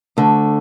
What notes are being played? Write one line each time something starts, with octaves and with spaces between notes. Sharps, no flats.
D2 D3 A3